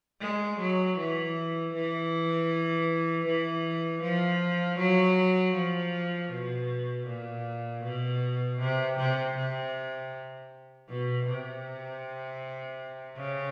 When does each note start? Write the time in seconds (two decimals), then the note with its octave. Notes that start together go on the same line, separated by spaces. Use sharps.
0.21 G#3
0.59 F#3
0.98 E3
1.74 E3
3.26 E3
4.03 F3
4.79 F#3
5.55 F3
6.31 B2
7.07 A#2
7.84 B2
8.60 C3
8.98 C3
9.36 C3
10.89 B2
11.26 C3
13.17 C#3